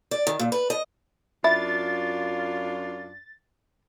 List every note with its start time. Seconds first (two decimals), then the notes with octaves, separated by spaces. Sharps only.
0.11 D5
0.27 D#3
0.39 A#2
0.52 B4
0.70 D#5
1.44 F#2 D4 E4 F4 A6